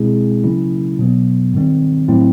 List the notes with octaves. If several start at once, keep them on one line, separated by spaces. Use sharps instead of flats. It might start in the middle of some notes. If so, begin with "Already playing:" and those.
Already playing: B2 G#3 C4 E4 G#4
C#3 F#3 A#3 C#4 E4
B2 F#3 B3
G#2 D#3 G3 C4
A2 F#3 A3 C4 E4